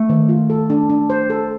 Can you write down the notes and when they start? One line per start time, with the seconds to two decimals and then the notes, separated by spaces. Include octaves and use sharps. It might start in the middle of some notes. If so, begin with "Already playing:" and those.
Already playing: A3
0.09 D#3
0.29 F4
0.50 A4
0.70 D4
0.90 D4
1.10 C5
1.30 A4